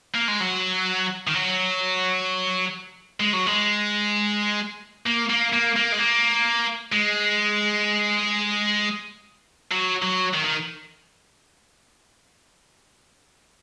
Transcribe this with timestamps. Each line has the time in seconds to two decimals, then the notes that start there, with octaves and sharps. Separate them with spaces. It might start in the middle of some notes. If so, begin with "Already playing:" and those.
0.15 A#3
0.28 G#3
0.40 F#3
1.27 D#3
1.34 F#3
3.20 G#3
3.33 F#3
3.46 G#3
5.06 A#3
5.30 A#3
5.53 A#3
5.76 A#3
5.92 G#3
5.99 A#3
6.92 G#3
9.72 F#3
10.03 F#3
10.34 D#3
10.45 D#3